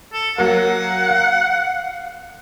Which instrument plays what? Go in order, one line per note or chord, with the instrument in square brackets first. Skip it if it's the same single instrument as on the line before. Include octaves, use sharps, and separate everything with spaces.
[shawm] A4
[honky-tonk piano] F#3 A#3 [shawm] F#5
[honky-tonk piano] F5